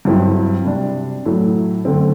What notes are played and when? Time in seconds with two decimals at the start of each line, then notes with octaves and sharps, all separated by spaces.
0.05 G2 F#3 C4 E4
0.65 C3 G3 D4
1.26 A2 F#3 A3 E4
1.85 F#2 D3 A3 C4